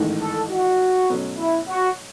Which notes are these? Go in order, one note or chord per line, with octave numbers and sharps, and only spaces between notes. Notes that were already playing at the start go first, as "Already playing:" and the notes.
Already playing: A1 G#2 D#3 A3 E4
A4
F#4
B2 F#3 A3 C#4
E4
F#4